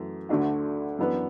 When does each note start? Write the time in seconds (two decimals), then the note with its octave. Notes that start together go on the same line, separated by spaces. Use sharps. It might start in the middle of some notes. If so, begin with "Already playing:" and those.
Already playing: F#2 E3 A3
0.29 D2 D3 A3 D4 F#4
0.99 F#2 E3 B3 D4 B4